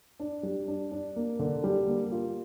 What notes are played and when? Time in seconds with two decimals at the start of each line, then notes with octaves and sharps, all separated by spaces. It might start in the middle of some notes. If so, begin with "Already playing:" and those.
0.20 D4
0.43 G3
0.68 D4
0.91 D4
1.16 A#3
1.39 D3
1.64 G3
1.88 A#3
2.12 F4